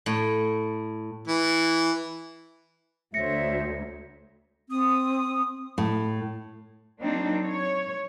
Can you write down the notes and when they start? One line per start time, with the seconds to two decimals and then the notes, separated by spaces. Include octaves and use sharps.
0.06 A2
1.27 E3
3.14 D2 C5 C#5 E5 A#6 C#7
4.69 C4 D#6
5.78 A2
7.00 F#3 A#3 C4 D4 D#4
7.44 C#5